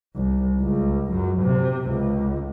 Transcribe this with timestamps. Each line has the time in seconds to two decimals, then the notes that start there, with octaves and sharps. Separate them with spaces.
0.16 C2
0.61 C#2
1.12 F#2
1.43 C3
1.90 C#2